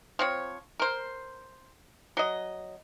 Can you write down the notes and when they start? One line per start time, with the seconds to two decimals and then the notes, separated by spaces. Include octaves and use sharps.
0.19 F3 C4 C#5
0.80 A#4 C5
2.17 F#3 D#5